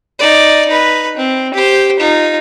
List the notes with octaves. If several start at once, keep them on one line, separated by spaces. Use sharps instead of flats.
D#4 D5
D#4 B4
C4
G4 C5
D#4 F4